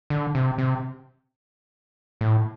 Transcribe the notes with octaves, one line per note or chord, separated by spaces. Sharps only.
D3
C3
C3
A2